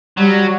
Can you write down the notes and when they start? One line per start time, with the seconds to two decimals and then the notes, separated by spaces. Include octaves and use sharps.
0.17 F#3 G3